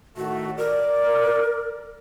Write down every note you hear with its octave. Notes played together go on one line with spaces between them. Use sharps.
A2 D#3 A3 F#4
A#4 D5